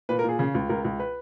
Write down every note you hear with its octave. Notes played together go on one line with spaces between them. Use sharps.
A#2 B4
A#4
A#2 G#4
C#3
C#2
C#2 A#4
C#2
B4